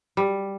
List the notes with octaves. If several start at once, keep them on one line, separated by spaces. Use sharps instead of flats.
G3